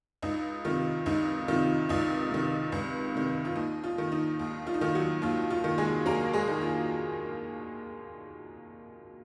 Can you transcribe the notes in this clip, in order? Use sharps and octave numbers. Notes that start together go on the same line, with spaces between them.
C#2 D#4
C3 D#3 F4
C#2 D#4
C3 D#3 F4
C#2 D#4
C3 D#3
C#2
C3 D#3
F4
D#2 D#4
F4
D#3
D#4
D#2
F4
D#4
D#3 F4
F#3 F#4
D#2 F4
F4
D#3
G#3 G#4
D#2 A#3 A#4
G#3 G#4
D#3
F4